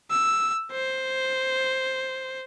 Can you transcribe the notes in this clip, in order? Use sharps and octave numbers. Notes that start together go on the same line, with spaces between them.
E6
C5